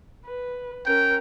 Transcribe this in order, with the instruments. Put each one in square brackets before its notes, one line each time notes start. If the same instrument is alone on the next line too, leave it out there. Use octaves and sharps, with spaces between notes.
[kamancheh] B4
[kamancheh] C#4 A#4 [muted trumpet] G5